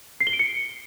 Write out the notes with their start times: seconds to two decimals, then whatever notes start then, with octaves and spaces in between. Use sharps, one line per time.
0.20 C7
0.27 G7
0.33 D7
0.39 C#7